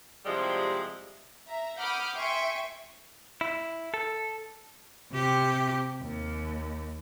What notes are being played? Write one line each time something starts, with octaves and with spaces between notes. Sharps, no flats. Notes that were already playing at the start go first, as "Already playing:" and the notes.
C3 F3 G3 G#3 E4
E5 A#5
F#5 B5 D6 D#6 F6 G6
E5 G5 G#5 C6 C#6 D7
E4
A4
C3 G4
D#2